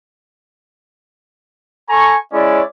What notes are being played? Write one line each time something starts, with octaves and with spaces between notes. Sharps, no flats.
A4 G#5 A#5 C#6
G#3 C#4 E4 C#5 D5